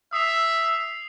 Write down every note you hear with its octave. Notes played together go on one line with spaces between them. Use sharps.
E5 D#6 C7 F7